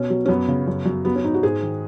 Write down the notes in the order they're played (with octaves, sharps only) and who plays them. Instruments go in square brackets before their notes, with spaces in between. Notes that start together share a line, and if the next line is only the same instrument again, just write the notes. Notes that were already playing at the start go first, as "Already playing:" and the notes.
Already playing: [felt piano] B2 C#4
F#3
C#4
F#2 B3
C#3
F#2
F#2
F#3 B3
C#4
G#2 D#4
F#4
G#2 G#4
D#3